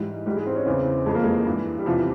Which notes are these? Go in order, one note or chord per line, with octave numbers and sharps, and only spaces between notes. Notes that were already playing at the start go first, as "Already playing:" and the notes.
Already playing: G#2 E3 G3
G#2 E3 G3
G#3
C4
C#4
E2 C#3 E3 C4
F2 E3 G#3
A#3
G#3
G2 E3
G3
E2 C3 E3 F3
E3